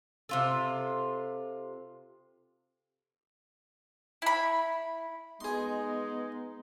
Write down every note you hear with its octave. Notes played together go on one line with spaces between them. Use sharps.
C3 F4 A4
E4 B5
G#3 B3 D#4 G#4 C6